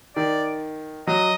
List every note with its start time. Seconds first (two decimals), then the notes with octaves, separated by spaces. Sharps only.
0.16 D#3 D5
1.07 F#3 D#5